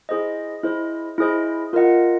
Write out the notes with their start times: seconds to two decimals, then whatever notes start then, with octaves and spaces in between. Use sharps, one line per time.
0.09 E4 G#4 C5 D#5
0.63 E4 G#4 C5 D#5
1.18 E4 G#4 C5 D#5
1.73 F4 A#4 D#5 F#5